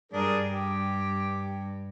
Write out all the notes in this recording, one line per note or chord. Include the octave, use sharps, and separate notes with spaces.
G2 D4 G#4 A#4
G4